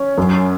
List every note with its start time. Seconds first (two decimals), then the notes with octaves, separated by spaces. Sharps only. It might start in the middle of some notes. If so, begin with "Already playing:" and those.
Already playing: C#4
0.18 F#2